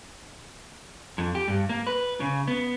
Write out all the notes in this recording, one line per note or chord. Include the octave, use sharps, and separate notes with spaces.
F2
G4
G2
A#3
B4
C#3
B3